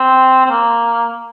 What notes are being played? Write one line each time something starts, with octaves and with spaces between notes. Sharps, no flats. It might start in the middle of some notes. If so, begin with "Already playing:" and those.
Already playing: C4
C4
A#3